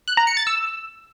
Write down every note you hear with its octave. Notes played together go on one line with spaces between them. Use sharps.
F#6
A#5
C#7
A6
E6